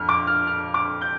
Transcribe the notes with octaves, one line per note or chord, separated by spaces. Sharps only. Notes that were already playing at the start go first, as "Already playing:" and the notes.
Already playing: F2 F6
D6
F6
F6
D6
G6